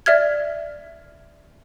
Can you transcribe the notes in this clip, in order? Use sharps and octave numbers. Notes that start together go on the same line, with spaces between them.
D5 E5 F6 G#6